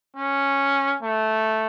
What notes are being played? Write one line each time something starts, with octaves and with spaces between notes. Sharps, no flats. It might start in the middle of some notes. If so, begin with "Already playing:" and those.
C#4
A3